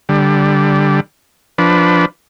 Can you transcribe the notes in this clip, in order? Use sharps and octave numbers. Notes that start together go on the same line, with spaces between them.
D3 G3
F3 D4 B4